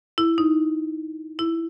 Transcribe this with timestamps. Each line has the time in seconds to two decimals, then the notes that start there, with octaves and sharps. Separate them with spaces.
0.18 E4
0.38 D#4
1.39 E4